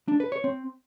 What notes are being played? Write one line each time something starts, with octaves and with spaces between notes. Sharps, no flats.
D4
B4
C#5
C4